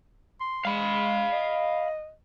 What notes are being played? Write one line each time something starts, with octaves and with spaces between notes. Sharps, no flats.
C6
G#3 F5 B5
D#5